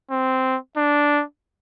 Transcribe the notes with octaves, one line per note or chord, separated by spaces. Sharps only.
C4
D4